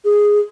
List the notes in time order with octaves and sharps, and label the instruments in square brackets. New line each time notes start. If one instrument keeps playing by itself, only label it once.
[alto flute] G#4